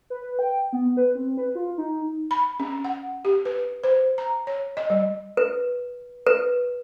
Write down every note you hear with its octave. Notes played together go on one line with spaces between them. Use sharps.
B4
G5
B3
B4
C4
B4
F4
D#4
B5
C#4
F#5
G4
B4
C5
A#5
C#5
D#5
G3
B4
B4